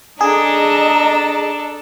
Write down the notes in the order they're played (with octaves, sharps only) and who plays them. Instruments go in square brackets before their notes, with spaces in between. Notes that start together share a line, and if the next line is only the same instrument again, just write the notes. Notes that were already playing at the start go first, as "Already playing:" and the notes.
[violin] D4 A4 [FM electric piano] G#4 [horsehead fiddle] D#5 A#5